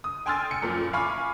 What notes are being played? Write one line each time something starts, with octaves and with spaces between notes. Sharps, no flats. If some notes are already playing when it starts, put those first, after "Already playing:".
D#6
G5 G#5 C6 E6 F6 A6
C#7
F#2 A#2 F3
F5 G#5 B5 C#6 D6 F6